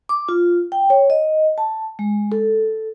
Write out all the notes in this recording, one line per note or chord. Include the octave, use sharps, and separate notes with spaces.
D6
F4
G5
C#5
D#5
A5
G#3
A4